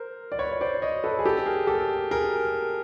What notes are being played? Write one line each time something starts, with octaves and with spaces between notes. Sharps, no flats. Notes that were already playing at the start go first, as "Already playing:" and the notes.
Already playing: A#4 C5
D5
B4 C#5
C#5
C5 D5
C#5 D#5
A4 B4
G#4
G4 A4
G#4 A#4
G4 A4
G#4 A#4